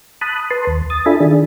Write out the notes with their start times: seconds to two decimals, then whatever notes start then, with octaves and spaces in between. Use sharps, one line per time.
0.21 A5 B5 D#6 F#6
0.50 B4 A5 C6
0.67 D#2
0.90 D#6 A6
1.06 D4 F4 A4 E5 G#5 B5
1.20 D#3 D4 G#4